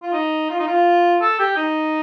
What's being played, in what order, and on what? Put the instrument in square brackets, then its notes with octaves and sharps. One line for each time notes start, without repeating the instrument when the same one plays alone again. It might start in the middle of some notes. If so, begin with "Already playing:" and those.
[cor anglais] F4
D#4
F4
D#4
F4
A4
G4
D#4